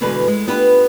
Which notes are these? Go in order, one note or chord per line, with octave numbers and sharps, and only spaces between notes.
E2 B2 D3 G#3 D4 B4
G#3
B3 D4 F4 G4 B4